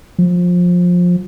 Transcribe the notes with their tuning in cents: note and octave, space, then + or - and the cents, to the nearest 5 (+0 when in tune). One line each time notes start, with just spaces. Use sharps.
F3 +20